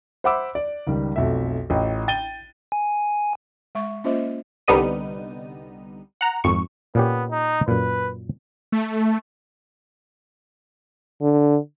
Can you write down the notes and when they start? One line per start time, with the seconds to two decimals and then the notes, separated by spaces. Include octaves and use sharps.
0.24 C5 E5 F#5 B5 D6 E6
0.55 D5
0.87 C#2 D#3 G3
1.16 B1 F2 A3 E5
1.70 A1 F4 D#5 G5
2.08 G5 A6 D#7 G7
2.72 G#5
3.75 G#3 E5 C#6
4.04 A#3 C#4 F4 C5 D#5 E5
4.68 C2 D3 G3 B3 D#4 D#7
6.21 F#5 A#5
6.44 G#1 F2 C#6
6.95 A#2 B3 C#4 G4
7.31 D#4
7.68 F#2 A#2 B4
8.72 A3
11.22 D3